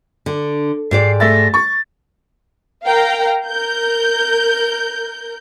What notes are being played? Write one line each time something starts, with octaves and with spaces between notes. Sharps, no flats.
D3
G#2 G4 D5 C7
A3 E5 A6 A#6
C#6 A6
A#4 F5 G5 A#5
A#4 G6